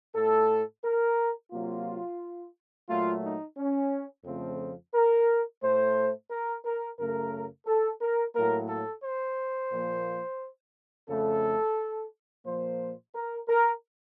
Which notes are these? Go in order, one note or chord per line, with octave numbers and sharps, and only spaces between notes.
A2 A3 A4
A#4
C3 F#3 A#3 F4
A#2 F#3 A3 F4
D#4
C#4
F2 C#3 F3 A3 C4
A#4
A2 A3 C5
A#4
A#4
F#2 C#3 A3 A#4
A4
A#4
A2 F#3 A#3 A#4
A4
C5
A#2 F3 A#3
F2 C#3 A3 A4
A#2 F3 A#3 C5
A#4
A#4